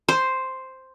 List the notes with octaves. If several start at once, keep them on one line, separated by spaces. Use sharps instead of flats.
C5